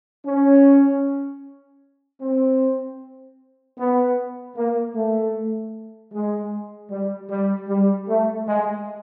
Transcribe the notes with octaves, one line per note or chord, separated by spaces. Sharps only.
C#4
C4
B3
A#3
A3
G#3
G3
G3
G3
A3
G#3